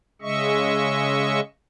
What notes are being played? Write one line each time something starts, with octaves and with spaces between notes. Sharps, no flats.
C#3 G#3 D#5 E5 C#6